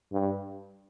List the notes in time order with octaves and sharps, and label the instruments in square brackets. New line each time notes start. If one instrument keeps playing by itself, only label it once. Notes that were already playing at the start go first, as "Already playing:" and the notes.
[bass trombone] G2